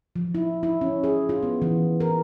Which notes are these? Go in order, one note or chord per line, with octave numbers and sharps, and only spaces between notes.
F3
E4
E4
C#4
G#4
F4
B3
E3
A#4